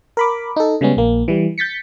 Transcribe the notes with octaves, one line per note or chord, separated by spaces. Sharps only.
A#4 B5 D6
D#4 A4
C#3 G3 G#3 B3 C#4
A#1 A#3
E3 G3
G6 A6 B6 C#7